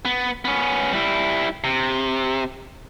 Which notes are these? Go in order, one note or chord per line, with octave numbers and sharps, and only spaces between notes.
B3
B3 C#4
G3 E4
C3